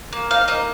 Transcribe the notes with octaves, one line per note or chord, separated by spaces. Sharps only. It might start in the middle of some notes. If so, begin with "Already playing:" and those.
A#3
D#4 F5
A#3 D#5